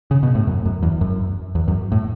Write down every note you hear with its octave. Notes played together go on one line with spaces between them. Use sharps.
C#3
B2
A2
F#2
F#2
E2
F#2
E2
F#2
A2